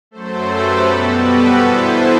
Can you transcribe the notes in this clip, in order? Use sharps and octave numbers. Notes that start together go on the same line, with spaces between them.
F#2 F#3 A3 A4 C5
G4 B4
B2 G3 B3 F#4 A4
G4 B4
G2 E3 B3 E4 A4 C5